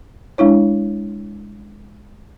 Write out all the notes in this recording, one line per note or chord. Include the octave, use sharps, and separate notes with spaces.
G#3 D4 E4 C#5